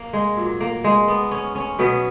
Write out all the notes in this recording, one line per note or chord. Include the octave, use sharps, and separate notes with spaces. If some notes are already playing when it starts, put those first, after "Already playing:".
Already playing: A#3
G#3
A#2 F#3
A#3
G#3
B3
C#4
C#4
B2 F#3 B3